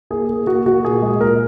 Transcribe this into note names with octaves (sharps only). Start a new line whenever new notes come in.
A#3 G#4
A#3
A#3 F#4
A#3 F#4
A#2 G#4
G#3
A#2 A#4